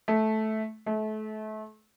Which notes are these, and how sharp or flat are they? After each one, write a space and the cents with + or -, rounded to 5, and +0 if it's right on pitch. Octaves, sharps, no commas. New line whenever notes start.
A3 -10
A3 -30